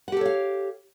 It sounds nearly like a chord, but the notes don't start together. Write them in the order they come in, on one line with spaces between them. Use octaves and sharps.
F#5 G4 A4 C#5 F5